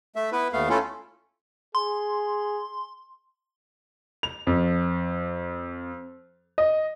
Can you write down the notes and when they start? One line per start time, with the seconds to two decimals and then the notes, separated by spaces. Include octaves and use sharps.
0.16 A3 E5
0.32 B3 E4 B4
0.53 D#2 A3 B3 F5
0.69 A3 C#4 E4 F4 A4
1.75 G#4 C6
4.23 F7
4.47 F2
6.58 D#5